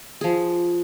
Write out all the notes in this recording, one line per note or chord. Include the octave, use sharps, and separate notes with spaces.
F3 G#4